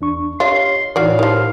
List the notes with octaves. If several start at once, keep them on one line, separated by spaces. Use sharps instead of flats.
E2 D4 C#6
F4 G4 C#5 D#5 C6
A2 E3 D#4 F#4 D5 F5
D#3 F3 G4 A#4